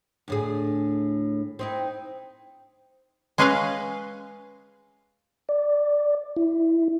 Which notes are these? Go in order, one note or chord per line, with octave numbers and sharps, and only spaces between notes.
D2 A2 G#4
C4 D#4 E4
G#3 C#4 G#4 B4 D#5 F5
D5
E4